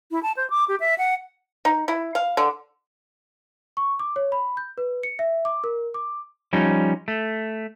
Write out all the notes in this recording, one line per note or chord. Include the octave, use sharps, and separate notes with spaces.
E4
A5
C5
D6
G4
E5
F#5
D#4
E4
F5
D3
C#6
D6
C#5
B5
G6
B4
C#7
E5
D6
A#4
D6
F3 G3 C#4 D#4
A3